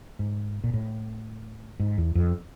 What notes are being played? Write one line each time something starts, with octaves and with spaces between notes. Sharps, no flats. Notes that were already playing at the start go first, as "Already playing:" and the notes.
G#2
A#2
A2
G#2
E2
F2